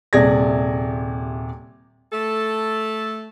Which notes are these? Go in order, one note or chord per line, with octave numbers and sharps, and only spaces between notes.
D#1 C3 G#4 D5 G#6 A#6
A3 A4